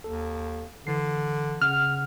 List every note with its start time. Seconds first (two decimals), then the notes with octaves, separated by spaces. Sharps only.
0.04 D#2 A4
0.87 D3 E3 C7
1.61 C#3 F#5 F6